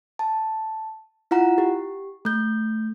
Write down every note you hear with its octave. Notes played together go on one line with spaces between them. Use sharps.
A5
E4 F4 F#5 A#5
G4
A3 G6